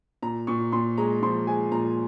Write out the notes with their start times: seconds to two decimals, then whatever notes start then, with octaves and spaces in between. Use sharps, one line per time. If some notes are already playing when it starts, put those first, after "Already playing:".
0.22 A#2 A#5
0.47 A#2 C#6
0.72 A#2 C6
0.98 G#3 A#5
1.22 F3 C6
1.47 G#3 G#5
1.72 A#2 A#5